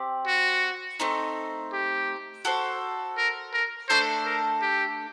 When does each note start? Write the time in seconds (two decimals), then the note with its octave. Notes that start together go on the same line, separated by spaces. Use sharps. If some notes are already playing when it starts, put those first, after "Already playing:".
Already playing: C4 G4 D5
0.27 F#4
1.00 A3 C4 D#4
1.73 G4
2.45 F#4 A4 C5
3.17 A#4
3.53 A#4
3.89 A3 D4 A4 C5
4.26 A#4
4.62 G4